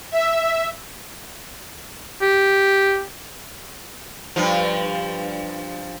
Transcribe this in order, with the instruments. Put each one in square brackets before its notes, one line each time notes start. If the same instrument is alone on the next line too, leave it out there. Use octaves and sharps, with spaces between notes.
[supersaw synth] E5
[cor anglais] G4
[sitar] G2 F3